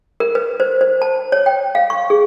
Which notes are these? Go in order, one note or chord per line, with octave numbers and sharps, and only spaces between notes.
A#4
B4
C5
C5
A5
C#5
G5
F5
C#6
G#4